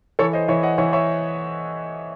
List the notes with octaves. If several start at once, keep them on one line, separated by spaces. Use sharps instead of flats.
E3 A4 C#5
C5 D#5
E3 C#5 E5
D#5 F#5
E3 C#5 E5
C#5 E5